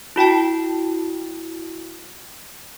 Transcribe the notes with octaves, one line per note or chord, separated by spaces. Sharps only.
E4 F#4 G5 A5